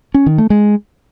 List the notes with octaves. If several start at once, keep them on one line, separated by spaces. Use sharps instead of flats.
C#4
D#3
A3
G#3